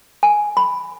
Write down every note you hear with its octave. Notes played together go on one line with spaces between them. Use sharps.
G#5
B5